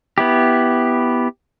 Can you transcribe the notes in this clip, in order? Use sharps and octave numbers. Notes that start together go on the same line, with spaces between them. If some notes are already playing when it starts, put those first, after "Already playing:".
B3 E4 G4